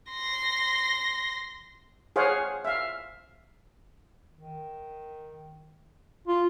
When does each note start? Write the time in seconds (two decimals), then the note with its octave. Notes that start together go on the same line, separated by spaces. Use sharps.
0.12 C6 A#6
2.16 G#4 C5 C#5 F5 F#5
2.65 E5 F5
4.34 D#3
6.27 F4